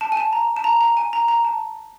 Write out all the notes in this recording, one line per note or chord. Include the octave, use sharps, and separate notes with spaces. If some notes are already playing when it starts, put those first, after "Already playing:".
A5
G#5
A5
A#5
A5
A#5
A#5
G#5
A#5
A#5
A5